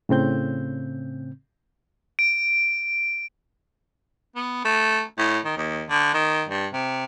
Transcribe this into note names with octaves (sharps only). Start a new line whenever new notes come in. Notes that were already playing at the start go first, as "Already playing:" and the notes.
A2 C#3 C4 G6
D7
B3
A3
A2
D#3
D#2
D3
D#3
G2
C3